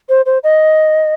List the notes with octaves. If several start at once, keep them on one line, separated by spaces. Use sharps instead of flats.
C5
C5
D#5